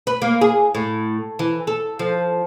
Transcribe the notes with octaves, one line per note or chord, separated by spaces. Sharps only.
B4
A#3
G#4
A2
E3
A4
F3